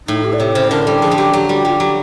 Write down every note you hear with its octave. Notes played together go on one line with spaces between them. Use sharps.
A2 D#4
G4
D5
C3 C#5
C#3 C5
D3 A#4
G3 A4
F3 G#4
G3
F#3 G4
F#3 G4
G3 F#4
G3 F4
F#3 G4